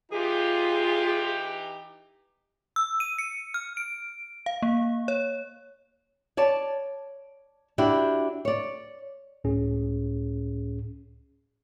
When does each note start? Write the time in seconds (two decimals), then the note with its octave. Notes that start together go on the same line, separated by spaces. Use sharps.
0.12 E3 D#4 F4 G4 G#4
2.76 E6
3.00 D#7
3.18 C#7
3.54 F6
3.77 D7
4.46 F5
4.62 A#3
5.08 C#5
6.37 C#5 D5 A5
7.78 D4 E4 F#4 G4
8.45 C#5 D5
9.44 C#2 A2 C#4 G#4